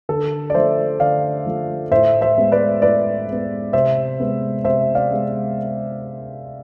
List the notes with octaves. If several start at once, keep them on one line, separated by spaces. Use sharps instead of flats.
D3 A4
D5
F3 A3 C5 E5
D3 D5 F5
F3 A3
A2 C5 E5
C5 E5
G#3 B3
B4 D5
A2 B4 D5
G#3 B3
C3 C5 E5
G#3 B3
C3 C5 E5
D5 F5
G#3 B3